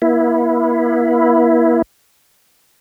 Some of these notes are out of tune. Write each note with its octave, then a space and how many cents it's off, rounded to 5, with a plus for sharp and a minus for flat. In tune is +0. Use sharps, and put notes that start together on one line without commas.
A#3 +45 E4 +0